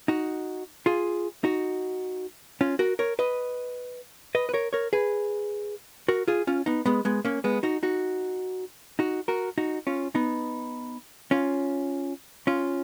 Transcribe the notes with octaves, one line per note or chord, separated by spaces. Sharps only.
D#4 F#4
F4 G#4
D#4 F#4
C#4 F4
F#4 A#4
A#4 C#5
B4 D#5
B4 D#5
B4
A#4 C#5
A#4 C#5
G#4 B4
F#4 A#4
F4 G#4
C#4 F4
B3 D#4
G#3 B3
G#3 B3
A#3 C#4
G#3 B3
D#4 F#4
D#4 F#4
D#4 F#4
F#4 A#4
D#4 F#4
C#4 F4
B3 D#4
C#4 F4
C#4 F4